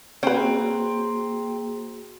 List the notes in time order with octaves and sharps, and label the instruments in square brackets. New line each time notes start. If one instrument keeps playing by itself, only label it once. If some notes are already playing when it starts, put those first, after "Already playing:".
[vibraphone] A#3 F#4 G#4 [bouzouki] C4 [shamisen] C#4 B4